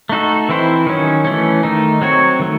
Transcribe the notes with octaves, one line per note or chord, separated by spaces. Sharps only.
A3 D#4 F#4 A4
E3 C4 E4 C5
D#3 F#3 C#4
E3 A3 C#4
D#3 A3 D#4
F#3 C4 F#4 C#5
D#3 A3